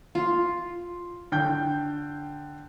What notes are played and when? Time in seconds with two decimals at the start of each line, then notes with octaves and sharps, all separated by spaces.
0.15 F4
1.32 D3 G5 G6